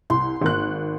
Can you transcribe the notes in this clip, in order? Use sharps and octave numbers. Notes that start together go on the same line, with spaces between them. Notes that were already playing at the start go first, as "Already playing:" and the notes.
C2 C6
G#1 A#3 F#6